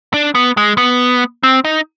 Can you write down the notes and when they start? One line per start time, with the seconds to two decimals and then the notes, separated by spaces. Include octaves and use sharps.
0.14 D4
0.35 B3
0.57 G#3
0.78 B3
1.43 C4
1.65 D#4